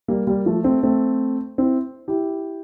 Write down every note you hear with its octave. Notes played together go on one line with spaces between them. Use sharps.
G3 A#3
G3 A#3
F3 A3
A3 C4
A3 C4
C4 E4
E4 G4